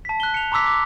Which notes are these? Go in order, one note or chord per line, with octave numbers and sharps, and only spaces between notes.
A5 B6
F#6 G7
C#7 F7
A#5 C6 D6 E6 B6
D6